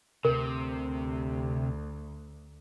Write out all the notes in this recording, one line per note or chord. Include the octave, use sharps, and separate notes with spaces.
D2 C3 A#4